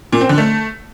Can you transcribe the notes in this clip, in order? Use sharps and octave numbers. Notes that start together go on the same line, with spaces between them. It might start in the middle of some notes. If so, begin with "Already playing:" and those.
A#2
C4
D3
A3